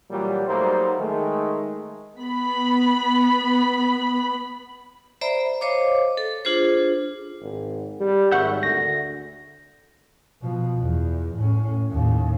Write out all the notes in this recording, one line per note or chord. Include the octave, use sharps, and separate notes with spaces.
A#2 E3 F#3 G3
F#3 G3 A3 A#3 D#4 C5
D#3 G#3 A3
B3 B5
C5 D5 E5 A#5 B5
C5 C#5 D#5 F5 D6
A4
D4 F4 G#4 C5
G#1
G3
G#1 E5 F#5 C#6 G6
D2 A#6
B2 F3
E2
A2 C#4
D#2 A2